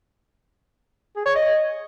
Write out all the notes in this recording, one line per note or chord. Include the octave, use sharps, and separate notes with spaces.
G#4
C#5
D#5